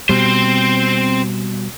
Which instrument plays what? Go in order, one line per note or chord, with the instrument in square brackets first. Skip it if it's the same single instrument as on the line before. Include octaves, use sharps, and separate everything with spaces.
[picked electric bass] B2 G3 [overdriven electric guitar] C4 C5